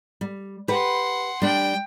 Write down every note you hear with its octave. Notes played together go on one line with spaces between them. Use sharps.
G3
G4 B4 F#5 C6
G3 D4 G5